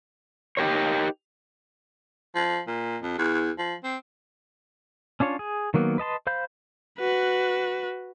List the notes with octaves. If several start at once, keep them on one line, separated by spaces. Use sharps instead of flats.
D#4 G4 A#4 C#5
F3
A#2
F2
E2
F3
C4
C#4 D4 F4 C#5
G#4
D#3 F#3 A#3 B3
B4 D#5 A5 C6
C5 F5 B5 G6
F#4 B4